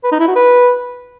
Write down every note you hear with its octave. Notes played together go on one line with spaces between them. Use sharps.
B4
D#4
E4
F#4
B4